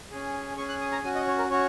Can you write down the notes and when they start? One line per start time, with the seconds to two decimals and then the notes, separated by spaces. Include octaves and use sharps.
0.11 C#4 G#4
0.57 C#4 G#4 C#6
0.69 F#6
0.80 D#6
0.92 A#5
1.03 C#4 F#4 G#5
1.15 D#5
1.27 C#5
1.38 A#4
1.50 C#4 F#4 C#5